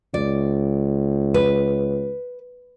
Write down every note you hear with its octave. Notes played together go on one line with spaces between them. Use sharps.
C#2 D5
B4